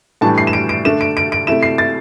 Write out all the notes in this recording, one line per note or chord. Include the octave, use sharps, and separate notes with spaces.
A2 E3 G3 D4 A5
C7
E7
D7
D7
D3 A3 D4 E7
D7
D7
D7
C3 A3 E4 E7
C7
A6